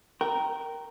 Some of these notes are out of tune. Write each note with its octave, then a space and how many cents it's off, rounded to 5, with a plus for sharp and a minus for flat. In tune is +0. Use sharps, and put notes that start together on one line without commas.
A#4 +0 G5 -15